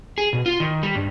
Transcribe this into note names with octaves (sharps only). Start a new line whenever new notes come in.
G#4
B2
F4
D#3
G3
G2